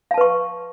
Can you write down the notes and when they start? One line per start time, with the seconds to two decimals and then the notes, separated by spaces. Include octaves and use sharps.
0.11 F5
0.14 A5
0.18 B4
0.21 C#6